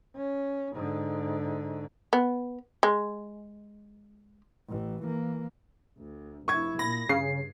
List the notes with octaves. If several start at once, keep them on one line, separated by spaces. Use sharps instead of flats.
C#4
G#2 D3
B3
G#3
A1 E3
E3 A#3
D2
F1 E4 C#6 G#6
A#2 B5 A#6
G2 C#3 C7